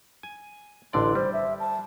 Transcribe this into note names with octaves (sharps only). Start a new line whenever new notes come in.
G#5
A1 D3 D5 C6
G3 C5
E5
A5